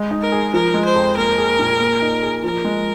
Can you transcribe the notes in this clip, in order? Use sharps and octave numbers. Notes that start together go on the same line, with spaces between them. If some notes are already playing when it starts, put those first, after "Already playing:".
Already playing: G#3
D#4
A#4
G#4
F3 A#4
G#3
C5
F2
A#3 A#4
G#4
A#2
A#3
D#4
G#4
F3 A#4
G#3